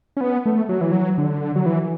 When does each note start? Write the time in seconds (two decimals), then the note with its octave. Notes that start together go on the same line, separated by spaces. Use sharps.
0.17 C#4
0.21 B3
0.46 A3
0.69 F#3
0.81 E3
0.91 F#3
1.18 D3
1.56 F#3
1.66 E3